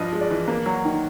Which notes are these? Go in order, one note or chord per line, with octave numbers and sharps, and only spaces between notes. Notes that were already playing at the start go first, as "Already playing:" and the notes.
Already playing: G2 F3 D#5
G#3
D5
E3
A#3
F#3
D#3